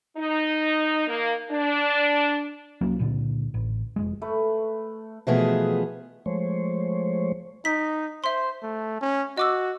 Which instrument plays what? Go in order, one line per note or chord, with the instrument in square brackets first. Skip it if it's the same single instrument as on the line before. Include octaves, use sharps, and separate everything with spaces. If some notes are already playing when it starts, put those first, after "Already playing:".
[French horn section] D#4
A#3
D4
[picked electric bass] C2 F#3 A#3 C#4
C#2 A#2 D3
A1
F1 C2 G#3
[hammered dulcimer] A3 B4
[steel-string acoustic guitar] B2 E3 F3 A3 B3 G#4
[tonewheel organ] F3 G#3 A3 C5 C#5
[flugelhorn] D#4 [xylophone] B6
[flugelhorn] C5 [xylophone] E5 C6
[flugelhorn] A3
C#4
[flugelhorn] F#4 [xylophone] D#5 D6 E6